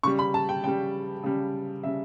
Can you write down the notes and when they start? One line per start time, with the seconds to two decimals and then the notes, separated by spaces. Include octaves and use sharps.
0.03 C#3 G3 C#6
0.19 B5
0.34 A5
0.49 G5
0.63 C#3 G3 G5
1.23 C#3 G3
1.83 C#3 G3 E5